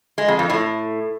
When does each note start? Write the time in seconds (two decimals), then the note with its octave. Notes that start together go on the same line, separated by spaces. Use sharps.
0.18 G#3
0.28 F2
0.39 F2
0.50 A2